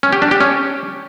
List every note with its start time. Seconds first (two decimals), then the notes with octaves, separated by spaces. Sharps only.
0.03 C#4
0.13 G4
0.22 D4
0.31 G4
0.41 C#4